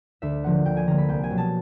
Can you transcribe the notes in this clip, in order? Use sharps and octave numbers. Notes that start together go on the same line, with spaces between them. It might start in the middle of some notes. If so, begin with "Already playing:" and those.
D2 E5
D3 F3 A#3 F#5
D2 G5
G#5
D3 F3 A#3 A#5
B5
C2 G5
G#5
B2 F#3
A5